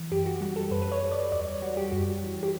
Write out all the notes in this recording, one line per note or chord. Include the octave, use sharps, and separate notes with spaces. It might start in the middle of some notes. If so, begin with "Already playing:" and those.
Already playing: E3
F#2 G4
F#4
G3 F#4
A4
F#2 B4
B4
C#5
G3
D5
E2 D5
C#5
G3 F#4
G4
F#2 F#4
E3
G4